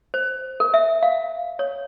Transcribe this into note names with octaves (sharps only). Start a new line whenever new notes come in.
C5
A#4
E5
F5
C#5